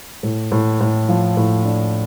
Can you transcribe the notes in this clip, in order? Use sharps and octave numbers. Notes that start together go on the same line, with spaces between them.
A2
A2
A2
F3
A2
D4